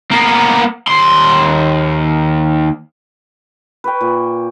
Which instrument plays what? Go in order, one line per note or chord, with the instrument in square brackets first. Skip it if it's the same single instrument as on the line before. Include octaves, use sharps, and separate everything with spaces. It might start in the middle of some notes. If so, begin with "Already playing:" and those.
[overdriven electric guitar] A#3 B3
D#2 C6
[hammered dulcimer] B4 C#5 G5
A#2